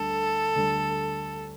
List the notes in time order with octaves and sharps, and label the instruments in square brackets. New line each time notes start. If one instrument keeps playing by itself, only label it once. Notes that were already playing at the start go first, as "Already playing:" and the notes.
Already playing: [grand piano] D2 D3 G3 [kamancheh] A4
[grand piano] D2 D3 G3